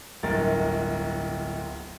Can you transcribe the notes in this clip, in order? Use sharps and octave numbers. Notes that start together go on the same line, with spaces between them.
D1 G1 A#4 A6